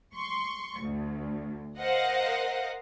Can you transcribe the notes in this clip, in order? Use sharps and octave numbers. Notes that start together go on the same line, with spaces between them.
C6 C#6
D2
A#4 C5 D#5 F5 F#5